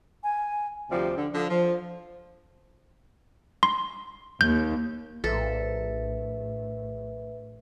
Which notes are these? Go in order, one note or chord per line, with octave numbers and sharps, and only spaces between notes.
G#5
D2 C3 F3 G3 C4
D3
D3 F3
F3
C6
D#2 G6
A#1 A2 A4 B4 E5